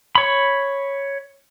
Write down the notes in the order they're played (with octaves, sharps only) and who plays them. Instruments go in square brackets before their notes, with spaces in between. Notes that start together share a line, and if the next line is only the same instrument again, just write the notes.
[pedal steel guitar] C#5 B5